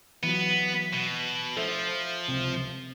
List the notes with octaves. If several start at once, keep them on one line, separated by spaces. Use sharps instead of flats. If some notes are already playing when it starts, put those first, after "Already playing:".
E3 F#3 B3
B2
F3 A4 C5 E5
C#2 C3